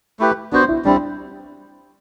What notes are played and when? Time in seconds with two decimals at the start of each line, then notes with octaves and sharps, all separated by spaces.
0.19 A3 E4 G4 B4
0.52 B3 D4 F#4 C5
0.68 E4
0.85 G3 C4 D4 E4